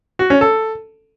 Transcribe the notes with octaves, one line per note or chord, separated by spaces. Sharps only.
F#4
C#4
A4